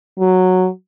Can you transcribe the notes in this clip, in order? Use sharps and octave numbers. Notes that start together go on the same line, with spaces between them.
F#3